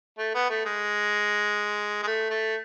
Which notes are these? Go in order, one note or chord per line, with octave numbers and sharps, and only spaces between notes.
A3
B3
A3
G#3
G#3
A3
A3